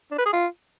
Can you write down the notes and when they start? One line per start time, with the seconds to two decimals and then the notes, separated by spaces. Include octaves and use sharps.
0.11 D4
0.19 B4
0.26 G#4
0.33 F4